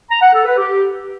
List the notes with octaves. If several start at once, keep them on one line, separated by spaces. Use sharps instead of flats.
A#5
F#5
A4
B4
G4